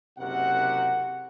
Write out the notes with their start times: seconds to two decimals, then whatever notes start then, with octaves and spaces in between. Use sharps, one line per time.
0.18 F#1 C3 F#4 A#4 F#5